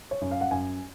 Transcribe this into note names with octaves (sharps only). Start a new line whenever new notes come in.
C#5
F#2
F5
F#5
F#2 G#5